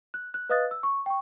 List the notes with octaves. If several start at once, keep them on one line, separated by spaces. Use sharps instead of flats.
F#6
F#6
B4 D#5 F5 D#6 F#6 A6
E6
C#6
G5 C#6